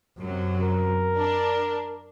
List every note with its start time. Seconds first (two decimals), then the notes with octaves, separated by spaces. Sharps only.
0.18 F#2 C3 F#3
0.62 A#4
1.18 D4